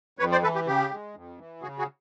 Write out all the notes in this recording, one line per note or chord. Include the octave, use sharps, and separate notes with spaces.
F2 B4 C#5
C5 D5
E3 A4 B4
G4
C#3 G4
G#3
F2
E3
C#3 F#4 G#4
F#4 G#4